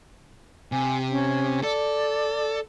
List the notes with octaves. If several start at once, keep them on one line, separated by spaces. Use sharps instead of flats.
C3 G#5
C#4
A4 D5